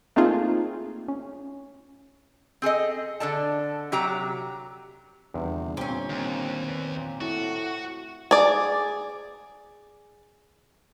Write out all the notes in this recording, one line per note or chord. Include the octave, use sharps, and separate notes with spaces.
A3 A#3 C4 D#4 F4 G#4
C#4
C4 G#4 A4 D#5
D3 A4 D5 A5
C3 F#3 G4 A#5
G1 E2 C3 D#3
A#2 C4 C#4 G4 G5
D#2
B4 C#5 D5
A#2
A2 F#4 A4
G#4 D5